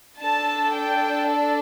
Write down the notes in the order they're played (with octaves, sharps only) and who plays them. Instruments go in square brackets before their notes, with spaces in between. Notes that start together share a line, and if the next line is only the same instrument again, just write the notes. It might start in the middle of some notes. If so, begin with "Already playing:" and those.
[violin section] D4 A4 A5
G5
D5